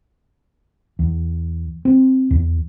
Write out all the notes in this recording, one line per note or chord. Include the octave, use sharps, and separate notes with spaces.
E2
C4
E2